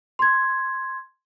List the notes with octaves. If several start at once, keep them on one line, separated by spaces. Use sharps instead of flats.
C6 G#6